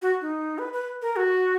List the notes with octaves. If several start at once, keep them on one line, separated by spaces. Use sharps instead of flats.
F#4
D#4
B4
B4
A#4
F#4